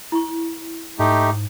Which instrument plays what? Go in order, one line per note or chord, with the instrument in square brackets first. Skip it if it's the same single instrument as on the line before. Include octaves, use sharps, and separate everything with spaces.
[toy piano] E4 C#6
[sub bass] G#2 [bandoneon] A3 D#4 G4